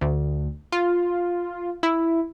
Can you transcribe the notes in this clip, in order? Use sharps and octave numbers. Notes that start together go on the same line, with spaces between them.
D2
F4
E4